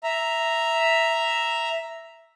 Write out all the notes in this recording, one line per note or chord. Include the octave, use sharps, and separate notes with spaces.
E5 A#5